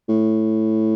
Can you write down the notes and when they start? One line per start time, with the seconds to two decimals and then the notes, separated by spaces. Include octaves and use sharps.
0.09 A2